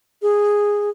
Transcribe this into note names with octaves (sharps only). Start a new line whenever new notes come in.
G#4